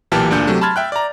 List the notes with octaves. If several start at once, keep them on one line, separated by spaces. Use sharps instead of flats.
B1 A#2 E3 G4 A5 F6
D2 A#2 D4 G6 C#7
C3 F#3 A3
A5 B5 C6 F6 G#6 A6
E5 G5 F#6
D5 A#5